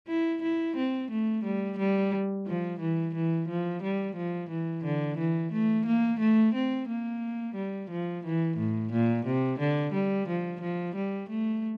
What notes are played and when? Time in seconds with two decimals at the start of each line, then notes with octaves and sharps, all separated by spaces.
0.08 E4
0.43 E4
0.77 C4
1.11 A3
1.44 G3
1.79 G3
2.47 F3
2.80 E3
3.15 E3
3.49 F3
3.83 G3
4.16 F3
4.50 E3
4.85 D3
5.18 E3
5.52 A3
5.86 A#3
6.20 A3
6.54 C4
6.88 A#3
7.55 G3
7.91 F3
8.25 E3
8.57 A2
8.92 A#2
9.26 C3
9.59 D3
9.93 G3
10.28 F3
10.61 F3
10.96 G3
11.29 A3